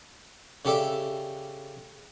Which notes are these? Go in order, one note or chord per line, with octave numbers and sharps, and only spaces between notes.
C#3 G4 A4 D5 E5